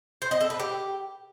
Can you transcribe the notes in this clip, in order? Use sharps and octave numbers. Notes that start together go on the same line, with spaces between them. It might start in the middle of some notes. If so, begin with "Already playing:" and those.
C5
D#5
A4
B4
G4